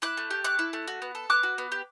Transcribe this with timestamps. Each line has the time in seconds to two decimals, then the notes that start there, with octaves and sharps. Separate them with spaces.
0.02 E4 D6 F#6
0.17 A3
0.31 G4
0.44 A3 D6 F#6
0.59 E4
0.73 A3
0.88 F#4
1.02 B3
1.15 A4
1.30 B3 D6 F#6
1.43 F#4
1.58 B3
1.72 G4